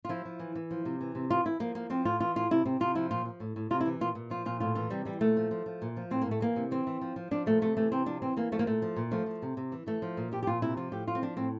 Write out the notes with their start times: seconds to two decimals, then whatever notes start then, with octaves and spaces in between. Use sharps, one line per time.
0.05 F4
0.09 F3 E4
0.25 F3
0.39 E3
0.55 E3
0.71 F3
0.85 C3
1.01 E3
1.15 C3
1.30 E3 F4
1.45 E3 E4
1.60 F3 A#3
1.75 F3 A#3
1.90 F3 C4
2.05 A2 F4
2.20 E3 F4
2.36 A2 F4
2.51 C3 E4
2.65 C3 C4
2.80 C3 F4
2.95 F3 E4
3.11 A#2 F4
3.25 F3
3.40 A2
3.56 A2
3.70 C3 F4
3.80 E4
3.86 E3
4.01 A#2 F4
4.15 A#2
4.30 F3 F4
4.46 A#2 F4
4.60 A2 F4
4.75 E3 F4
4.90 C3 G3
5.05 E3 G3
5.20 A#2 A3
5.37 F3
5.51 F3
5.66 F3
5.82 A#2
5.97 F3
6.11 A2 C4
6.22 A2 A#3
6.31 A3
6.41 E3 A#3
6.56 C3
6.71 E3 C4
6.87 E3
7.01 F3
7.16 F3
7.31 F3 D4
7.46 A#2 A3
7.61 C3 A3
7.77 E3 A3
7.92 C3 C4
8.06 F3 D4
8.22 E3 C4
8.37 E3 A#3
8.52 F3 A3
8.59 A#3
8.67 A#2 A3
8.82 F3
8.96 A#2
9.11 F3 A3
9.26 F3
9.42 C3
9.57 C3
9.72 E3
9.86 E3 A3
10.02 F3
10.17 A#2
10.32 F3 G4
10.43 G4
10.47 A#2 F4
10.62 C3 E4
10.77 F3 F4
10.92 A2 G4
11.07 F3 F4
11.15 C4
11.22 F3 D4
11.37 A2 C4